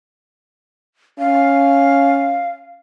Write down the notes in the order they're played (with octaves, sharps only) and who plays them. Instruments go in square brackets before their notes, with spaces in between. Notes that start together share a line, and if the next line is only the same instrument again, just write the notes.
[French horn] C#4 [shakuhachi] F5